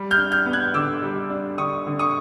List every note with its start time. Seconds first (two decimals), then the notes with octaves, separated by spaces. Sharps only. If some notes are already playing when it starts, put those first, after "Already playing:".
Already playing: G3
0.11 F6 G6
0.18 D4
0.31 F6 G6
0.46 B3
0.53 F#6 G#6
0.74 D3 D6 E6
1.02 G3
1.30 D4
1.58 D3 C#6 D#6
1.86 D3
1.99 C#6 D#6